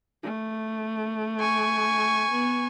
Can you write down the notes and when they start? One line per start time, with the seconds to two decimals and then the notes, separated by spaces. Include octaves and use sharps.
0.23 A3
1.40 G#5 C#6
2.31 B3